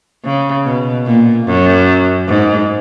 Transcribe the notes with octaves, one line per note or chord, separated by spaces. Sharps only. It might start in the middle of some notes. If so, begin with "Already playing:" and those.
C#3
B2
A#2
F#2
G#2